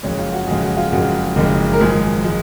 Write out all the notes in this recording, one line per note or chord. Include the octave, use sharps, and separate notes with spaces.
F#1 F2 C#3 G#3 C#5
F4
F#4
F#1 F2 C#3 G#3 G#4
F#4
F4
F#1 F2 C#3 G#3 F#4
F#1 F2 C#3 G#3
A#4
G#1 F#2 F3 G#3 G#4
F3 G#3